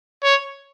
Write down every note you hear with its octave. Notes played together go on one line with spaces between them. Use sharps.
C#5